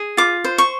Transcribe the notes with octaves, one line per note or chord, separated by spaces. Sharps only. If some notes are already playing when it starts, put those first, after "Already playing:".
Already playing: G#4
F4 D6
C5
C#6